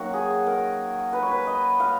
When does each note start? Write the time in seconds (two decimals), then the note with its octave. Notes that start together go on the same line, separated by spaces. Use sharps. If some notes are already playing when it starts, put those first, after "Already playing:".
Already playing: D#3 F#3 A#3 F#4
0.13 G#4
0.47 A#4
1.13 B4
1.22 C#5
1.31 B4
1.47 D#5
1.80 F5